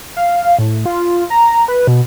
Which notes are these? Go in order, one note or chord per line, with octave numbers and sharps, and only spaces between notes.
F5
A2
F4
A#5
B4
B2